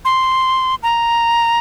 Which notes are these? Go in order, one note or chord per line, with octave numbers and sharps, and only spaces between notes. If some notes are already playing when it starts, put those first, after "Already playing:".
C6
A#5